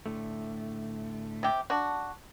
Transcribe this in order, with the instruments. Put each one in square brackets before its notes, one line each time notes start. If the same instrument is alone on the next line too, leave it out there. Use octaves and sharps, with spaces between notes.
[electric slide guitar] A2 D3 A3
[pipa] C3 G4
D4 F#4